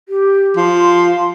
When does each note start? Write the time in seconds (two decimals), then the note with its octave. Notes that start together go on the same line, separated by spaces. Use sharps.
0.09 G4
0.56 F3 C6